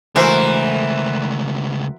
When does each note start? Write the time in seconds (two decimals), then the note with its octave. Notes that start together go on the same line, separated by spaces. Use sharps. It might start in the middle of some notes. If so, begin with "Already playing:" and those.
0.16 C#2 E3 A3 F#4 A#4 C5